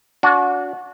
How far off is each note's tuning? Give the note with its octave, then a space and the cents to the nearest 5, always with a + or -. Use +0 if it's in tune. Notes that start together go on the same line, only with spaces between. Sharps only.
D4 -40 F#4 -25